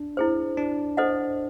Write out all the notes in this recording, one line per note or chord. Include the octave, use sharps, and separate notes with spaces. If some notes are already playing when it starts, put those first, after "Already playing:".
Already playing: D4
E4 G#4 C5
D4
A4 C5 D#5 F#5